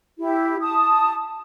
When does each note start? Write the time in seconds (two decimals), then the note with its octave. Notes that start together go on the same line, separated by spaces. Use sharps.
0.19 E4 G4
0.62 A5 D#6